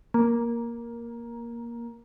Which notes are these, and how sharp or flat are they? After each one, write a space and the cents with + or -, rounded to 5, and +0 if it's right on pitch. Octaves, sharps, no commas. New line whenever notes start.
A#3 +10